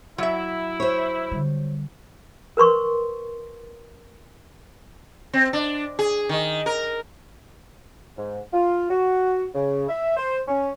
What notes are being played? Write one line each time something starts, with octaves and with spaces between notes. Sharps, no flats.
F#3 E4 E5
C5 C#5
D3 G3
A#4 B4 C6 C#6
C4
D4
G#4
D#3
A#4
G#2
F4
F#4
C#3
E5
C5
C#4